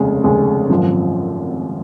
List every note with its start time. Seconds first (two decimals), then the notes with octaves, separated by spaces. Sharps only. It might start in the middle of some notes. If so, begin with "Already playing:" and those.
Already playing: F1 D#2 C#3 G#3
0.24 F1 D#2 C#3 G#3
0.69 G#1 F#2 F3